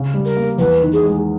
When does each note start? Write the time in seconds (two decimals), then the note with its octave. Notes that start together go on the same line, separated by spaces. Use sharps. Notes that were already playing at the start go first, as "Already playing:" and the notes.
Already playing: C#3
0.14 G3
0.25 A#4
0.37 A#3
0.58 E2 B4
0.82 D#3
0.93 G#4
1.03 G#3